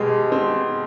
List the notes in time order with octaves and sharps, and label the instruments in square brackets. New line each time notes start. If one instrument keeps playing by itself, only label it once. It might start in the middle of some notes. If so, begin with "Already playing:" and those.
Already playing: [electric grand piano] B2 G4 [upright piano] G#3
[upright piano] C4